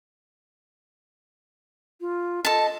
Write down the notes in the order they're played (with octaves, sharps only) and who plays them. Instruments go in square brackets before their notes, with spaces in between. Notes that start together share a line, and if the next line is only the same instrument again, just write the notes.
[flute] F4
[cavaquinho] A4 A5 [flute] D#5